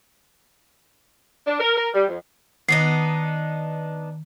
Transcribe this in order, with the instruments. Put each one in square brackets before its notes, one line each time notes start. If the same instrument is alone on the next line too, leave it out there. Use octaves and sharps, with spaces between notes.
[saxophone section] D4
A#4
A#4
G3
F2
[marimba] D#3 [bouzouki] B3 D4 D#4 [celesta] C7